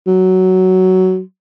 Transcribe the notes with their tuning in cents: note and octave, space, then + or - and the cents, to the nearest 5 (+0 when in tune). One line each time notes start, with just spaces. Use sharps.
F#3 +10